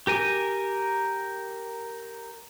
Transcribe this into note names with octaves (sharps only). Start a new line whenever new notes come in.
G4 A#4 G#5